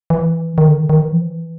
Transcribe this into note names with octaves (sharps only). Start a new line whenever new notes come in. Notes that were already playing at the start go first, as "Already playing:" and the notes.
E3
D#3
D3
D#3
D#3
E3
F3
E3